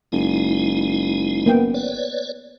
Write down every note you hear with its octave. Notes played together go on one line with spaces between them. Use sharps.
F#1 G#3 D#4 E4
A#3 B3 G5
B4 C#5 D5